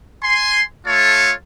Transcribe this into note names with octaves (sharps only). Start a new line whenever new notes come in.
G#5 C6
A3 F4 A4 C#5